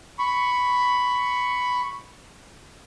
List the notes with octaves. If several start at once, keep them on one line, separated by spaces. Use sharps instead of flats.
B5 C#6